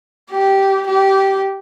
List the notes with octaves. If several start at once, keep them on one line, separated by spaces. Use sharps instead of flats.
G4
G4